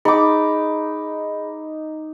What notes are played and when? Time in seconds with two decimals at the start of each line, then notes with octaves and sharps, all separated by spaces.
0.05 D#4 G#4 B5 D6